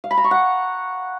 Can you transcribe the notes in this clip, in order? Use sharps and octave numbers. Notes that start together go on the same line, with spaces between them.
F5
B5
A#5
C#6
F#5